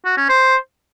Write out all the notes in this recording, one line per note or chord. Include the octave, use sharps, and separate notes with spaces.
F#4
C#4
C5